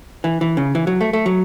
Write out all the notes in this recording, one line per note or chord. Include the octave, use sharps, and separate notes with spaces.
E3
E3
C#3
E3
F#3
A3
A3
F#3